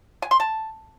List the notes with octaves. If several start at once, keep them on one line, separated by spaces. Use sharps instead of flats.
G#5
C6
A5